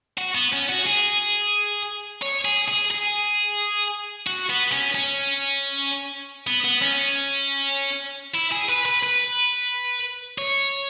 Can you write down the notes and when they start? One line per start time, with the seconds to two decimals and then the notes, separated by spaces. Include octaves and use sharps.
0.18 F#4
0.35 B3
0.53 C#4
0.69 F#4
0.86 G#4
2.22 C#5
2.45 G#4
2.68 G#4
2.91 G#4
4.27 F#4
4.50 B3
4.72 C#4
4.95 C#4
6.47 B3
6.64 B3
6.82 C#4
8.35 E4
8.52 G#4
8.69 B4
8.85 B4
9.03 B4
10.38 C#5